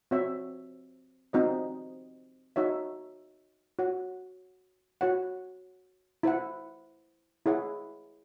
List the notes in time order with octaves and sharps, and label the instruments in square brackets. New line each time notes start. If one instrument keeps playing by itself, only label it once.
[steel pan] C4 F#4 C#5 E5
C4 D#4 F#4 C5 D#5
D#4 F#4 C#5 E5
F#4 C#5 F#5
F#4 C#5 F#5
E4 C5 F#5
E4 G#4 C#5 F#5